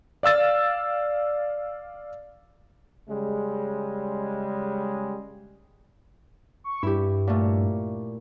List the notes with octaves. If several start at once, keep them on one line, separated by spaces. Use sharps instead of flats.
D5 F5 E6 A6
C#3 G3 G#3
C#6
G2 E4 G4
A#2 A3